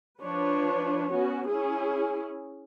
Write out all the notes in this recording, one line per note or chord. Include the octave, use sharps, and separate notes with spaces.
F3 D4 B4 C#5
B3 C#4 F#4
C#4 E4 G#4